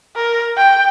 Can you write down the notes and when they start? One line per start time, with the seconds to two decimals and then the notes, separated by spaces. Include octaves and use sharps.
0.16 A#4
0.57 G5